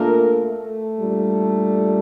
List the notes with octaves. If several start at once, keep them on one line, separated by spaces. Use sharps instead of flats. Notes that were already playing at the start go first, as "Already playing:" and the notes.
Already playing: A#2 A3 A#3 D4 A#4
A3 A4
A#2 G3 D4